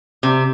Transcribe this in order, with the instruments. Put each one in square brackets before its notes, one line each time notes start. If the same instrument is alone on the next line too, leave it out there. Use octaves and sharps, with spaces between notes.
[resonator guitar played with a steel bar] C3